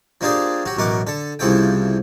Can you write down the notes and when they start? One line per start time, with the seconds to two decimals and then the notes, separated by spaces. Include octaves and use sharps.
0.21 F3 A#3 D4 G4 G#4 D5
0.65 F#3 F#4 G4
0.77 A1 F#2 B2 A#4 F#5 D6
1.07 D3 A4
1.39 C2 C#3 E3 F3 A4 G5